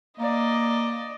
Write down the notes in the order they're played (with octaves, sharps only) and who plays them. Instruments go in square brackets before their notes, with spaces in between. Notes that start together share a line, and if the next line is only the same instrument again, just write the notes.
[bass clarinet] A#3 [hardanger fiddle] D5 D#5